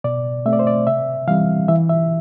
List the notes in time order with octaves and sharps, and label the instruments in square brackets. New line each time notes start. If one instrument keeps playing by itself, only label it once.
[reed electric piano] B2 D5
A3 C4 E5
D5
C5
D5
C3 E5
E3 G3 C4 F5
E3 E5
E5